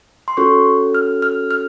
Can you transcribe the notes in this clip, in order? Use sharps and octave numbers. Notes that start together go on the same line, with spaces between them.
C6
C#4 F#4 A4 C#6
F6
F6
F6